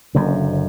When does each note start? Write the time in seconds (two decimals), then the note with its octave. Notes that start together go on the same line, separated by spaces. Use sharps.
0.15 F#1 F#2 D3